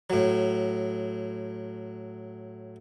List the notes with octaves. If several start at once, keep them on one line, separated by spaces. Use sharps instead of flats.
A2 F#3